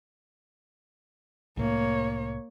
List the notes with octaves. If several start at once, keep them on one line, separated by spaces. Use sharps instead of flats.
C2 A2 A3 A#3 C#5